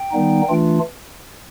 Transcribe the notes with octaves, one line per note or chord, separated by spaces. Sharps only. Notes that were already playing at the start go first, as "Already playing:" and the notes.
Already playing: G5
D#3 G3 B3 D#4
E3 A3 D4 F4